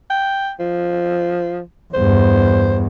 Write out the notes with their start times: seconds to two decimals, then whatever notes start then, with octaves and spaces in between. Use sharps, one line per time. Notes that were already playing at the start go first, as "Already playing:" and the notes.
0.10 G5
0.60 F3
1.94 E2 G2 C5